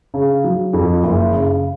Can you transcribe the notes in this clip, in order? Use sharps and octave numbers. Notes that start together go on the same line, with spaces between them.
C#3
F#3
F2
F#1
C#3